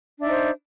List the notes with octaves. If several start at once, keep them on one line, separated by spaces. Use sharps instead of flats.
D4 D#4 C5 E5